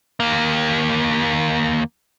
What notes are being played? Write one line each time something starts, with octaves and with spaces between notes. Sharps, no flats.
D#2 A#3